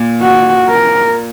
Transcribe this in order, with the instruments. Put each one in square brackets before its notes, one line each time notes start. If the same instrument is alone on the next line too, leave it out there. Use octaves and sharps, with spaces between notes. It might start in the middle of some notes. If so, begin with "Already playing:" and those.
Already playing: [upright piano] A#2
[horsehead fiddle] F#4
A#4